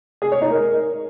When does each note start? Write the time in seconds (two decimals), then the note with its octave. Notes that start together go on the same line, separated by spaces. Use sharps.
0.22 G#4
0.32 C#5
0.42 D#4
0.52 A#4